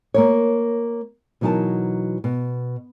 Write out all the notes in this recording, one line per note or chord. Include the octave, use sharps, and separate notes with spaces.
A#3 A#4 C#5
B2 E3 F#3 D#4 A#4 A5
B2